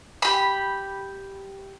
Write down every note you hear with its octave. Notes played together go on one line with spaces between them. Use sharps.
G4 B5